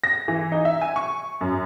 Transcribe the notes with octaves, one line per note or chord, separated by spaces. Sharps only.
A#6
E3
D#4
E5
G#5
C#6
F#2